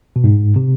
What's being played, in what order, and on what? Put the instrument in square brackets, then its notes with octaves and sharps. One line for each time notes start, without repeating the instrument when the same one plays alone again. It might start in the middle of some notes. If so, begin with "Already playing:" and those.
[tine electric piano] B2
G#2
C3